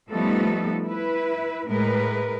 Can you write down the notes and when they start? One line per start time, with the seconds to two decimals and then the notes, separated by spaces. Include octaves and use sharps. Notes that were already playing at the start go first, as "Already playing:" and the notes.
0.10 F3 G3 A3 B3 D#4 A4
0.84 E4 B4
1.67 A2 G#3 A#4 B4